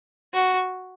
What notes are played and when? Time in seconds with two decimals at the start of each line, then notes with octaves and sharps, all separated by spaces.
0.34 F#4